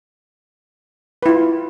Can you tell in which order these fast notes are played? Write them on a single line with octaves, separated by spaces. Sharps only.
B4 E4 F4